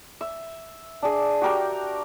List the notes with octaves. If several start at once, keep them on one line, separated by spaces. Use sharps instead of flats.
E5
D4 G#4
F#4 G4 A#4 G5